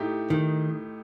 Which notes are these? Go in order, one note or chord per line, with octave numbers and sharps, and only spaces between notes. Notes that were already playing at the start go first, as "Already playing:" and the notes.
Already playing: A2 A3 D#4 G4
D#3